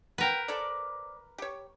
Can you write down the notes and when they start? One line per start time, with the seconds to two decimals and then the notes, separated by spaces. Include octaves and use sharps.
0.18 B3 A#4 B4 G5
0.48 A4 C5 D5
1.38 G4 C#5